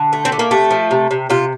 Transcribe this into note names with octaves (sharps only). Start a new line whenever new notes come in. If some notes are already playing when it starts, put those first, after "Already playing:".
Already playing: D3
A3
C4
D3
A#3
C3 A3
F3
C3
C3
C3 F4